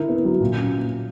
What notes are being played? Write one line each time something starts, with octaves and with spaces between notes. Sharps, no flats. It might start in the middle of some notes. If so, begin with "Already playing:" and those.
Already playing: D3 E4 A#4
B3
F#3
A#2
C#4